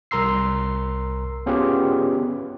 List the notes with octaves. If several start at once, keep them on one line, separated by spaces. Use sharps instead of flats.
C2 A#4 A#5 C6 E6 C7
B3 C#4 F4 G4 G#4 B4